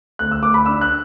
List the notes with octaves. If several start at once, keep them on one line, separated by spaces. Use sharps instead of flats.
D2 F#6
E6
D2 D6
B5
D4 E6
F#6